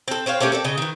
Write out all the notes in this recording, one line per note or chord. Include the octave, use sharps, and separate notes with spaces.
C4 A4
C4 C5 C#5 F5
A3 A#3 C#4 G4
C4 A4 D5
C#3 D#5
D#3 E3